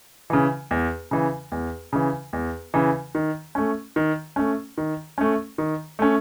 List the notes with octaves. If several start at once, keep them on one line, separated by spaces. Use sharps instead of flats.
C#3 E3
E2
C#3 E3
E2
C#3 E3
E2
C#3 E3
D#3
A3 C#4
D#3
A3 C#4
D#3
A3 C#4
D#3
A3 C#4